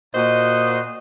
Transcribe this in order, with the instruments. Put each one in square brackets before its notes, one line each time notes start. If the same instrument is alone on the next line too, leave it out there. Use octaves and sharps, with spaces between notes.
[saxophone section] A#2 F#4 C5 D#5